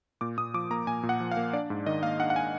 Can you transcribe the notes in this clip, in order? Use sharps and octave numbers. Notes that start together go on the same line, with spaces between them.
A#2 D6
A#2 D#6
F3 D6
A#3 A#5
A#2 G#5
A#2
F#5
F3
F5
A#3
D4 D5
G#2
D#3 D#5
A#3 F5
D4 F#5
F#5
G#5